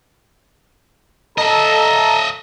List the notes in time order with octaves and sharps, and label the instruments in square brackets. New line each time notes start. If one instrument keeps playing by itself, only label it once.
[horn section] A4 A#5 [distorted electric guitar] D#5 E5